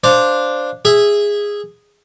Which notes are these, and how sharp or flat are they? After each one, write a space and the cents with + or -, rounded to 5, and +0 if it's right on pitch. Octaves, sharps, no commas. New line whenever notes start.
D4 +0 C5 +0 F5 +0
G#4 -10 E5 +0